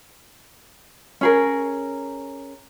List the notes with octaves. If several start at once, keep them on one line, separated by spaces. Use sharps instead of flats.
C#4 G#4 A#4